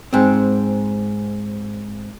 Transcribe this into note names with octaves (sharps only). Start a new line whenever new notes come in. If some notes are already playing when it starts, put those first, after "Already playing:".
G#2 C4